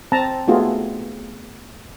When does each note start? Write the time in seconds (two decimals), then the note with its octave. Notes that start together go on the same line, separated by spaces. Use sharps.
0.12 C4 A5 A#5
0.48 A3 B3 D#4 F4 F#4 G#4